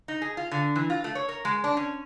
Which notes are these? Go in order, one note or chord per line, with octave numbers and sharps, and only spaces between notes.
D#4
G#4
F4
D3
E3
F4
A3
C#5
A#4
G#3
D4
C#4